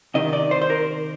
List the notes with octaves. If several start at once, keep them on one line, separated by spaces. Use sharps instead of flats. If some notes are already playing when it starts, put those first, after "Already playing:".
C3 D#3 D#5
D5
C5
C5
A#4